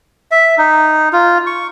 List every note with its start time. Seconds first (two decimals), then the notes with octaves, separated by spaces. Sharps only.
0.31 E5
0.58 D#4
1.13 F4
1.47 C#6